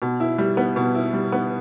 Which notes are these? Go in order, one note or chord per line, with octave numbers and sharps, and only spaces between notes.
B2
E4
G3
B3
B2
E4
G3
B3